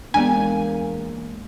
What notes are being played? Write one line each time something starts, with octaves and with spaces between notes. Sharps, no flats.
E2 G#3 A#3 B3 D4 D5 G#5